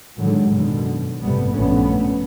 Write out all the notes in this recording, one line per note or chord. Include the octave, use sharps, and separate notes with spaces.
A2 D3 D#3 F#3 G#3
F#2 B2 D3 D#3
G1 A2 C3 G3 A3 B3
A#1 D3 A3 B3 C#4